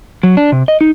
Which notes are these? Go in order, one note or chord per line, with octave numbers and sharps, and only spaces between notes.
F#3
D4
C3
D#5
D#4